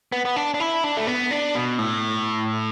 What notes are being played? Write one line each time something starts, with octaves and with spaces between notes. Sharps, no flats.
B3
B3
D4
D4
E4
D4
A3
B3
D4
B2
A2